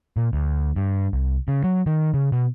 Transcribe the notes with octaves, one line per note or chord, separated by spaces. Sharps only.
A#2
D2
G2
C2
C#3
F#3
D#3
C#3
B2